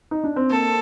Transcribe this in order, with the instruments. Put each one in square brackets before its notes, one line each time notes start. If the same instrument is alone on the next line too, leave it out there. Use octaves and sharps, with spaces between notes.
[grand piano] D#4
D4
C4
[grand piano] A#3 [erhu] A4